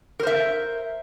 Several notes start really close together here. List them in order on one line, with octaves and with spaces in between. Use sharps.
A#4 C5 E5